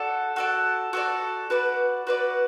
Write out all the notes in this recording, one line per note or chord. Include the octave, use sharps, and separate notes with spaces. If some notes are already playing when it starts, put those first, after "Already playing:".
Already playing: F#4 A4 D5
F#4 A4 D5
F#4 A4 D5
F#4 B4 D5
F#4 B4 D5